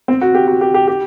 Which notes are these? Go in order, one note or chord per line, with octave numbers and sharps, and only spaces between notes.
C4
F#4
G4
F#4
G4
G4
G4